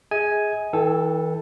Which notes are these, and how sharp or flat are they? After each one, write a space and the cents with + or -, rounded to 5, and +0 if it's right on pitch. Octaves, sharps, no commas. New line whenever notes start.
G#4 +0 D#5 +45 G#5 +0
E3 -35 A4 +0 G5 +0